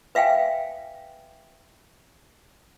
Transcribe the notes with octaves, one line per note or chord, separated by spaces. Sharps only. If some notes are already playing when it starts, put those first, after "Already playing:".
B4 E5 F5 G5 G#5